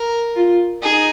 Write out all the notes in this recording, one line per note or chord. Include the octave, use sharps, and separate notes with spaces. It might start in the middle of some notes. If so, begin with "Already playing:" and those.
Already playing: A#4
F4
D#4 G#4